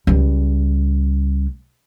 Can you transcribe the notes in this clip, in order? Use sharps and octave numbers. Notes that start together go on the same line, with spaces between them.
C#2 G3